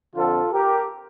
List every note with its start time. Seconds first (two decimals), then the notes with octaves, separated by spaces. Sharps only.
0.15 F2 D3 F3 C4 F4 A4
0.51 G4 A#4